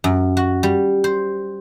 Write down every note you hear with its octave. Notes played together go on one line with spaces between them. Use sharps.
F#2
F#4
G3
C5